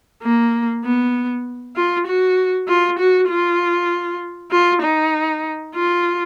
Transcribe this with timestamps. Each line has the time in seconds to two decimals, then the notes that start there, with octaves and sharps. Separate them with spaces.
0.23 A#3
0.84 B3
1.76 F4
2.07 F#4
2.68 F4
2.99 F#4
3.29 F4
4.51 F4
4.82 D#4
5.75 F4